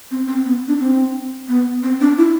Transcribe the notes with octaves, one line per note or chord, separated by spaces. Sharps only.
C4
C4
B3
D4
C4
B3
C4
D4
E4